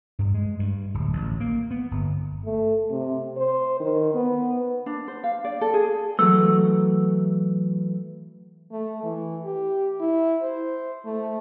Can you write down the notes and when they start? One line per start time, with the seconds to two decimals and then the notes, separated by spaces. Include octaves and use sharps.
0.19 G2
0.34 G#3
0.59 G2
0.94 D1
1.13 A1
1.40 A#3
1.71 B3
1.91 G1
2.45 A3
2.90 C3
3.37 C5
3.80 D#3
4.14 B3
4.86 D4
5.08 C5
5.24 F5
5.44 D5
5.61 A4
5.74 G#4
6.19 E3 F#3 A3 E6
8.72 A3
9.03 E3
9.45 G4
10.00 E4
10.42 C5
11.05 A3